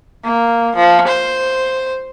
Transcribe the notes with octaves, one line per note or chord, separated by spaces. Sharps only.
A#3
F3
C5